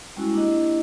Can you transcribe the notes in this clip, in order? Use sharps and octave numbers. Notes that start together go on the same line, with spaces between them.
G3 G#3 C#4 E4 F#4
A#3 D4 E4 G4 D#5